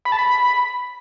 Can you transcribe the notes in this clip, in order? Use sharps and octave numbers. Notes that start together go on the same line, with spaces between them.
B5
A5
B5